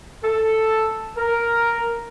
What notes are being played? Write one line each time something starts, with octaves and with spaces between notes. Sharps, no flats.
A4
A#4